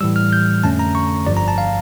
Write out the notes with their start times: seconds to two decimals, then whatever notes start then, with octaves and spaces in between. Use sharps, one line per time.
0.01 A2 E3 G3 E6
0.16 F6
0.33 G6
0.64 F2 D3 A3 C#4 A5
0.79 A#5
0.95 C#6
1.27 G1 G2 F3 D5
1.37 A#5
1.48 A5
1.58 F5